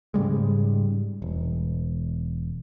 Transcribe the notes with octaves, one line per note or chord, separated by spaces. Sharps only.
G#2 C#3 G3 G#3
E1